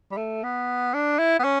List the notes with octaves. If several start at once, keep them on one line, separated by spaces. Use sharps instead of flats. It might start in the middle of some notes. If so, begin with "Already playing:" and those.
G3
A3
B3
D4
E4
B3
C#4